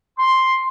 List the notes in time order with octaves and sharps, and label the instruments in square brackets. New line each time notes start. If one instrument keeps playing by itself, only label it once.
[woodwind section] C6